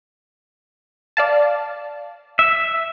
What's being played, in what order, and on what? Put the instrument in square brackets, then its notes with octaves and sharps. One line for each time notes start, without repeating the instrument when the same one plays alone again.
[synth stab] D5 F5 A5
[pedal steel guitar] E5